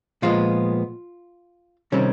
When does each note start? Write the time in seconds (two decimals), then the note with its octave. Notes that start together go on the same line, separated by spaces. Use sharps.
0.22 A#2 F3 G#3 B3 F4
1.92 C3 D#3 G3 C4 C#4